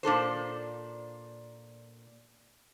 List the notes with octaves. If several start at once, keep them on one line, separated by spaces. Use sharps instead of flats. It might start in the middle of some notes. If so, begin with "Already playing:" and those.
A#2 D4 A4 C5